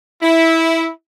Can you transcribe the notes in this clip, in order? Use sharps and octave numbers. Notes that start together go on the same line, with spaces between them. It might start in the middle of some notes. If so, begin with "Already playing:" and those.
E4